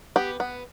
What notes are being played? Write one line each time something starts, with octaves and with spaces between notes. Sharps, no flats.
B3 G4
B3